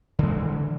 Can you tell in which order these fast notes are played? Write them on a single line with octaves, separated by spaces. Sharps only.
D3 G#3 E3